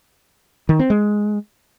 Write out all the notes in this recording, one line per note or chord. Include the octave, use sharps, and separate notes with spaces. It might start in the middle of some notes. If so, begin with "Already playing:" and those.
D#3
C4
G#3